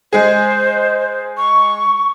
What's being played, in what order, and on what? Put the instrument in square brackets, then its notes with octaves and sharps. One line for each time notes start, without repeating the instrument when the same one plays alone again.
[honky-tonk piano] G#3 G#4 [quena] C5
[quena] C#6